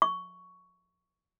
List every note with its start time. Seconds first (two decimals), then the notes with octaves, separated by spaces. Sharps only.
0.02 C#6